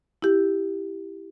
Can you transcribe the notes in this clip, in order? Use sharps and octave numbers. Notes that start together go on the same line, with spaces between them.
E4 G4